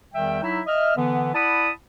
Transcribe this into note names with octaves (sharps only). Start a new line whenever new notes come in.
E2 D#3 G3 E5 G5
F#3 D#4 E4 E5
D#5 E5 F6
D3 E3 B3
E4 D5 F#5 A5 B5 D#6